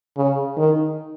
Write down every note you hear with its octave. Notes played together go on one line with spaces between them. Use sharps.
C#3
D#3